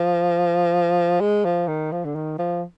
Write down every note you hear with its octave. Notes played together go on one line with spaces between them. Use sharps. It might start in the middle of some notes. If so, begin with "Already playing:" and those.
Already playing: F3
G#3
F3
D#3
F3
D3
D#3
F3